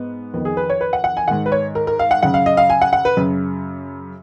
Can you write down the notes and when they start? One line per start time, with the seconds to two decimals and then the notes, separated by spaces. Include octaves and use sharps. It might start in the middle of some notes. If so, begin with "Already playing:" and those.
Already playing: G#2 B3
0.34 F2 D#3 B3
0.45 G#4
0.57 B4
0.70 C#5
0.81 B4
0.93 F#5
1.04 F#5
1.17 G#5
1.28 G#2 D#3 F#5
1.46 B4
1.52 C#5
1.75 A#4
1.87 A#4
1.99 F5
2.11 F#5
2.23 F#2 C#3 F#5
2.34 F5
2.46 D#5
2.57 F5
2.70 G#5
2.82 F#5
2.93 F#5
3.05 B4
3.17 F#2 C#3